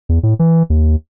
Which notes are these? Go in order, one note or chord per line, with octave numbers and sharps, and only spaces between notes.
E2
A2
E3
D#2